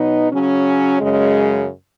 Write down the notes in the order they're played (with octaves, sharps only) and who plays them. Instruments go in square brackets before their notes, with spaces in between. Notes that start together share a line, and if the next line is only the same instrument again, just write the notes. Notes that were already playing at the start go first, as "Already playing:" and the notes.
Already playing: [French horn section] B2 F#3 B3 D#4
C#3 F#3 C#4
F#2 C#3 G#3